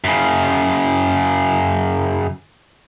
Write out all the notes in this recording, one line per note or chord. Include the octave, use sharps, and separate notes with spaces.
F#2 C#3